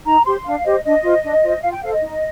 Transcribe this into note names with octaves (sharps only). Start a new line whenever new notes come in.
D#4 A#5
G4 C5 C6
D4 F5
G4 C5 D#5
D4 D#5
F4 C5
D4
F4 C5
F4 F5
G5
A4 C5 F5
D#5
D#4